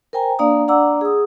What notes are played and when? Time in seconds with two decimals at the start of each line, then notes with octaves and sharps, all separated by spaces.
0.13 A#4 C5 G5 G#5 A#5
0.39 A#3 D4 D5 F5 A#5 D#6
0.68 D4 D5 F#5 A#5 D6 E6
1.01 G#4 D#6